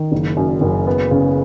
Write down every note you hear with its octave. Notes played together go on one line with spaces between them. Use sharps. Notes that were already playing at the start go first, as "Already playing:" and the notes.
Already playing: D#3
F#1
F#2
F#1
B3
C#3